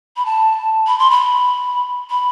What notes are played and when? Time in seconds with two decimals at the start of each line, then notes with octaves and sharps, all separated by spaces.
0.17 B5
0.26 A5
0.87 B5
0.99 C6
1.11 B5
2.10 B5